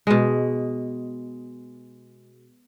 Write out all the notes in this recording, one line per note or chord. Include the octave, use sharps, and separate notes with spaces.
B2 G#3